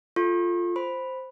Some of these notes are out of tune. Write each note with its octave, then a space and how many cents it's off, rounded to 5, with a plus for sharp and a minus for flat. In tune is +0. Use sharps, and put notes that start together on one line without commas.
F4 +0 A4 +0 C#6 -40
C5 +0 B5 +0